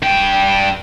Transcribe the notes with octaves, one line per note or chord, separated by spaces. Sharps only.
G2 G5